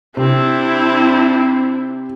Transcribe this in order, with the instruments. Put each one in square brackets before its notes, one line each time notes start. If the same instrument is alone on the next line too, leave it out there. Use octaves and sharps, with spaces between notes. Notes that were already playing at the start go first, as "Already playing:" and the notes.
[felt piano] C3 [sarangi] C4 [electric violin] D4 E4